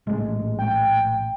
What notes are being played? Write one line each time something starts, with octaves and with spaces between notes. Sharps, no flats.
A#1 A2 G#3
G5